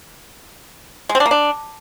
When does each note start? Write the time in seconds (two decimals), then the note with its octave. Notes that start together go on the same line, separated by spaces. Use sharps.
1.09 G#3
1.15 C4
1.20 D4
1.26 A#3
1.31 D4